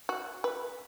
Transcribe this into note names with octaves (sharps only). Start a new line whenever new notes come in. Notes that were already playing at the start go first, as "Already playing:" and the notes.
F#4
B4